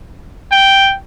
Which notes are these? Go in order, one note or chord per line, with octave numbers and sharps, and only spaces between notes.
G5